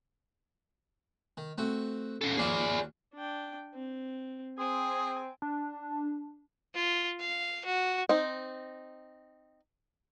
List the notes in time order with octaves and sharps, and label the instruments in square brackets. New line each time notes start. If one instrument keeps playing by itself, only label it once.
[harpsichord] D#3
A3 C4 F#4
[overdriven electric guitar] C#4 A4
[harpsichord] D#2 F4 F#4 [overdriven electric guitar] G#4 D5
[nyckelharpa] D4 G5
C4
[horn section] C4 [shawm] G#4 [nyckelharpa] G#5
[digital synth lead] D4
[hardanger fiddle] F4
F5
F#4
[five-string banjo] C4 D#4